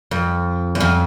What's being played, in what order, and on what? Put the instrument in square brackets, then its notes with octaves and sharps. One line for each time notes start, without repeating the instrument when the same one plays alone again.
[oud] F2
E2
F2